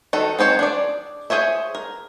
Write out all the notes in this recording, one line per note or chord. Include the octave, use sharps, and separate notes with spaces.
D#3 F#4 A4 A#5
C4 D#4 C5 C#5
D4 G#4 D5
G#4 C5 C#5 E5
A#4